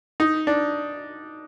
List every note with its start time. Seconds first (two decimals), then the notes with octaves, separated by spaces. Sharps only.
0.20 D#4
0.47 D4